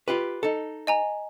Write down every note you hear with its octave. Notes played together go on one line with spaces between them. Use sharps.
F4 G4 B4
D#4 A4
D#5 G#5 A#5